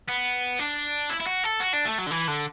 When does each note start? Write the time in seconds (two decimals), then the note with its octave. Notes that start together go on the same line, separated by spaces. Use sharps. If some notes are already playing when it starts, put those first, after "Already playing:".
0.09 B3
0.60 D4
1.10 E4
1.20 E4
1.27 F#4
1.44 A4
1.60 F#4
1.73 D4
1.85 A3
1.98 F#3
2.07 D3
2.11 E3
2.28 D3